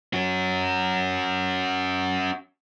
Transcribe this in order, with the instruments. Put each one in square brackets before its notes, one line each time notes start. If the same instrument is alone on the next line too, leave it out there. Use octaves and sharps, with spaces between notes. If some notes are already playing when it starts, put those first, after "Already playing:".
[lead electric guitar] C#4 F#4